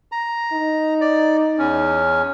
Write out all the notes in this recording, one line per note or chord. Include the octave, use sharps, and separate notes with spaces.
A#5
D#4
D5
E2 C#4